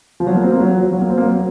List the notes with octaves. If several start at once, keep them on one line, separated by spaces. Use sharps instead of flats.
F3
F#3
A#3
C4
A#3
F#3
F3
F#3
A#3
C4
A#3
F#3